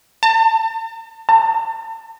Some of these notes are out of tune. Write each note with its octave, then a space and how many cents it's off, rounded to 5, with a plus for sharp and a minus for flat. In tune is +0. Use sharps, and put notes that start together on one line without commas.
A5 +40
A5 +45